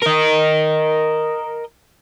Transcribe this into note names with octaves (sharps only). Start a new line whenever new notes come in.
A#4 D#5